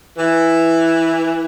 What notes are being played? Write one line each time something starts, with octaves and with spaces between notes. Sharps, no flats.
E3